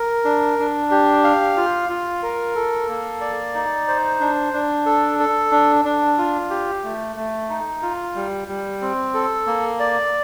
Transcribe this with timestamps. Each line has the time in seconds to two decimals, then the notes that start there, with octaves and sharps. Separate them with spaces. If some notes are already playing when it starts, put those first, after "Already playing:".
Already playing: A#4
0.25 D4
0.59 D4
0.91 G4
1.24 F5
1.57 F4
1.89 F4
2.23 A#4
2.56 A4
2.88 A#3
3.21 D5
3.55 D#4
3.88 C5
4.20 D4
4.53 D4
4.86 A4
5.19 A4
5.51 D4
5.85 D4
6.18 F4
6.50 G4
6.84 A3
7.16 A3
7.49 D#4
7.82 F4
8.15 G3
8.48 G3
8.82 C4
9.14 A4
9.47 A#3
9.80 D5